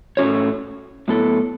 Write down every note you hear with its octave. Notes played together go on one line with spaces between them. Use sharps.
A2 A3 C#4 F#4 C#5
A2 F#3 B3 E4 A4